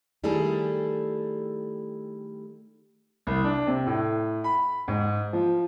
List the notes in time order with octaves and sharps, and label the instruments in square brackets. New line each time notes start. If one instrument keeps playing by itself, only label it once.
[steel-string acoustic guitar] D#3 G3 A3 E4 G#4 A4
[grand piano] C2
D4
C3
A2
B5
G#2
F3